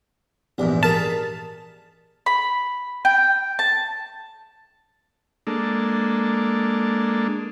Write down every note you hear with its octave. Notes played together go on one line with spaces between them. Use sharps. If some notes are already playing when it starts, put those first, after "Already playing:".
A#1 E2 G#2 B3 G4 D5
G#4 A#4 A5 D#6 F6 B6
B5
G5
A5
G#3 A#3 D4 A4